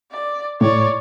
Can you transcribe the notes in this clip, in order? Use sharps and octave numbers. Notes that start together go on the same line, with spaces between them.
D5
A2 C#5 D5